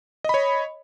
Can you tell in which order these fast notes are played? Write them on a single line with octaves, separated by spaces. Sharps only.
D#5 B5 C#5